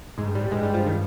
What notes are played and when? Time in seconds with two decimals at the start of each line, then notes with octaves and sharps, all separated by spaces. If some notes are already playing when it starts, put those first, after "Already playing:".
0.18 G#2 G#3
0.26 G2
0.35 G#2 G3
0.44 A2
0.51 G2 G#3
0.63 G3
0.74 F3
0.86 D#3